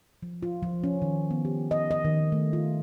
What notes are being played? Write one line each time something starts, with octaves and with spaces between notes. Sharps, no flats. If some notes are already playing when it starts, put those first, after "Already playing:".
F3
F4
F3
C#4
D#3
B3
G4
D#5
D#5
D#3
A3
F4